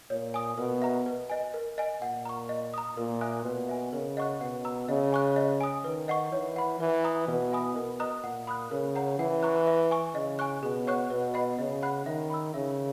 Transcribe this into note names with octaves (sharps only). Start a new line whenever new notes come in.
A#2 C#5
G#5 D#6
B2 A#4
E5 A#5
B4
D#5 G#5
A#4
D#5 G#5
A#2 F#5
A#5 C#6
D#5
A#5 D#6
A#2 A#4
E5 G#5 D#6 F#6
B2 B4
E5 G#5
C#3 A#4
D#5 F#5 C#6 F#6
B2 F#5
A#5 E6
C#3 D#5
G#5 C#6 F#6
D#5
G#5 D#6
D#3 B4
D#5 F#5 C#6
E3 C#5
F#5 B5
E3 B4
E5 A#5 D#6
B2 B4
E5 G#5 B5 D#6
B2 A#4
D#5 A#5 D#6 F#6
A#2 F#5
B5 D#6 F#6
C#3 A#4
C#5 F#5 A#5
E3 F#5
A#5 C#6 F#6
E5
G#5 C#6
C#3 D#5
G#5 C#6 F#6
B2 G#4
C#5 F#5 C#6 F#6
B2 B4
D#5 F#5 B5
C#3 D#5
F#5 B5 F#6
D#3 E5
B5 E6
C#3 E5